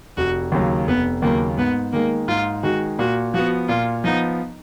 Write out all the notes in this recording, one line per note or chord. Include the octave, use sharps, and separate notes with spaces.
F1 F#4
D#2 C#3 F#3
F1 B3
D#2 C#3 F#3 A#3
G#2 B3
D#3 G#3 A#3
G#2 F4
D#3 G#3 F#4
A#2 F#4
F3 B3 F#4
A#2 F4
F3 B3 D#4